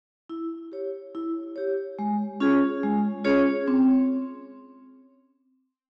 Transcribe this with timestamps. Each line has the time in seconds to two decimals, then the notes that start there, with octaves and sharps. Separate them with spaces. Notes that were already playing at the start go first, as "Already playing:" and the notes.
0.30 E4
0.72 G4 C#5
1.15 E4
1.56 G4 C#5
1.99 G#3
2.40 C#4 F4 G#4 C#5
2.83 G#3
3.24 C#4 F4 G#4 C#5
3.68 C4